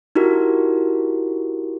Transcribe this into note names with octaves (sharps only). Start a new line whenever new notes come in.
D#4 E4 F#4 G4 A#4